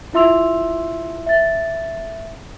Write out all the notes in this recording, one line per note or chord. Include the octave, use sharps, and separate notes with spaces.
E4 F4 E5 C6 E6 F7
E5 A6